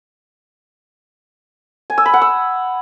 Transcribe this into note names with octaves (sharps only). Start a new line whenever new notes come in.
G#5
E6
B5
F#5
E6